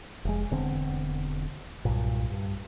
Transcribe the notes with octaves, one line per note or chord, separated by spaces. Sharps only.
F1 G#3
E1 D3 B3 C4
B1 G2 A#2
G2